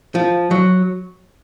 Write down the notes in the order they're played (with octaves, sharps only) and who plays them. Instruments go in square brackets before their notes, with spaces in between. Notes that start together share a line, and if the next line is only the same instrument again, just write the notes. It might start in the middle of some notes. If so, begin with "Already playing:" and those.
[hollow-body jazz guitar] F3
F#3